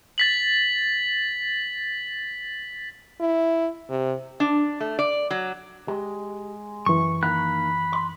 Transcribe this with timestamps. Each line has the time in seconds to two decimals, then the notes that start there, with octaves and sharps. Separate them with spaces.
0.18 A6 B6 F#7
3.20 E4
3.90 C3
4.40 D4
4.80 A3
4.99 D5
5.31 F#3
5.88 G#3 G4
6.86 F#2 E3 C#6
7.23 D#3 A#3 B5 F#6
7.93 C6